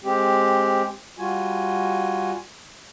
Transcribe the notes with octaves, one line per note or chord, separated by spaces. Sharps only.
G#3 C4 G4
G3 F4 F#4 G#5